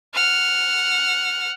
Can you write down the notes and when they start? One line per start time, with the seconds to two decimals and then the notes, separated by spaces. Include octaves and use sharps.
0.13 F#5 F6